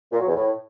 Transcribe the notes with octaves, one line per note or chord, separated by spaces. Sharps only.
A#2
F#3
E2
A2